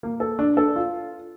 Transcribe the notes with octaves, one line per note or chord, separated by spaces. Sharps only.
A#3
A4
D4
A4
F4